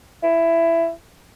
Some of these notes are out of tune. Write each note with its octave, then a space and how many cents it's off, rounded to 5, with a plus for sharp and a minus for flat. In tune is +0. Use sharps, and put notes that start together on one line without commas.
E4 +15